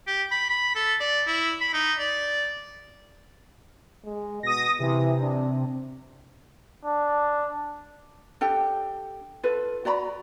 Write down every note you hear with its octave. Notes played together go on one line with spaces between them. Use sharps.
G4
B5
B5
A4
D5
E4
B5
D#4
D5
G#3
B2 D#6 A#6
C3 E3
D4
D4
D4 G4 A4 G5
F4 A4 B4
F#4 D5 A#5 B5